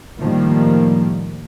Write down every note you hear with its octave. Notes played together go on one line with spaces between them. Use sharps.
A2 D#3 F3 G3 A#3